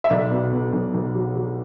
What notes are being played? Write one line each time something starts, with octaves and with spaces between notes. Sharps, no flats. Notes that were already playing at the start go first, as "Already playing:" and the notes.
E5
B1 D5
B2
B2
B1
B1
F#3
F#3